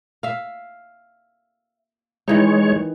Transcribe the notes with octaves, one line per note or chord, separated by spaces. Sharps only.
E5 F5
D#3 E3 G#3 D#4 C#5